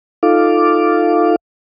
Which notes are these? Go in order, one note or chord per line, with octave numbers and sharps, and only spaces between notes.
D#4 F4 A4 F5 D6